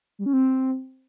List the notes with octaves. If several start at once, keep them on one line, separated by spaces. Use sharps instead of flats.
G3
C#4
C4